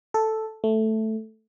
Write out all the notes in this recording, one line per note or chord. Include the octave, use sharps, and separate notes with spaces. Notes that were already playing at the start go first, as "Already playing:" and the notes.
A4
A3